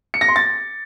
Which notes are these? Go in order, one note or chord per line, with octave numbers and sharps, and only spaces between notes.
C#7
A#6
C6
A6